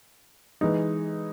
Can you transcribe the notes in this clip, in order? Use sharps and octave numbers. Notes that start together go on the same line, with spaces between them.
E3 G#3 D#4